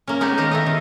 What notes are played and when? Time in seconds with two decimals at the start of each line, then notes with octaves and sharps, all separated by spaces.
0.07 A#3 C#4
0.21 G#3 B3 C#4 D#4 G4
0.37 D#3 G4 D#5 F5
0.51 E4 A4 D#5
0.66 D#3